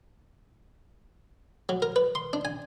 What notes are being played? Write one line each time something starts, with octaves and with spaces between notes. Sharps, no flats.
F#3
A#4
B4
C6
D4
G#5